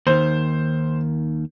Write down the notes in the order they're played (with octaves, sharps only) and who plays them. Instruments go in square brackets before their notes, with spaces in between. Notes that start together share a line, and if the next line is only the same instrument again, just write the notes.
[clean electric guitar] D#2 D#3 [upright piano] C5